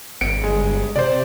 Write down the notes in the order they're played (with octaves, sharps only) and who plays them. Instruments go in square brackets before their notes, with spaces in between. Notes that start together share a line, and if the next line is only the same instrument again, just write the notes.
[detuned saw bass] G#1 [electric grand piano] C#7 D7
[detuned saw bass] G1 [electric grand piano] G#3
[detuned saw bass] C3 [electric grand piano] C5 D5